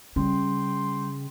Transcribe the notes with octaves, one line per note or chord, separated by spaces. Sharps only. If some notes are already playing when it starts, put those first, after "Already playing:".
C#3 G3 G5 C6